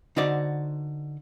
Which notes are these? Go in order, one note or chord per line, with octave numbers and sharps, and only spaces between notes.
D3 D#4 F#4 C5 D5